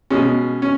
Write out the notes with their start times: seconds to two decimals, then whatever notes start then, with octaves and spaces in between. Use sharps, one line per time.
0.10 B2 G#3 C#4
0.62 C#4